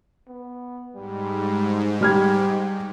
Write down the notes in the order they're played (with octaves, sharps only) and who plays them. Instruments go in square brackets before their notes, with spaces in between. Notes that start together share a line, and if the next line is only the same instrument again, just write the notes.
[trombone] B3
[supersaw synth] G#2 [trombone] G3
[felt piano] G3 F6 G#6 [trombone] G4